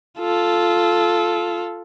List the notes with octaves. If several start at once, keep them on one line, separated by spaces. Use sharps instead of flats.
F4 A4